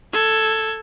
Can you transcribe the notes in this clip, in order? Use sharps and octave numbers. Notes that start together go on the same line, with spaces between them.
A4 G#6